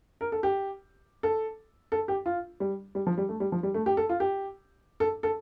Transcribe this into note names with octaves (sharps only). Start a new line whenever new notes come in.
A#4
A4
G4
A4
A4
G4
F4
G3
G3
F3
G3
A3
G3
F3
G3
A3
G4
A4
F4
G4
A4
A4